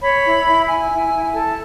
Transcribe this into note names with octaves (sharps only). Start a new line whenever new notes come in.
C#5 B5
E4
E4
E4 G#5
E4
E4
A4 A5